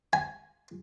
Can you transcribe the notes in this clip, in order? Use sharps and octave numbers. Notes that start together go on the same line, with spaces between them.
G#5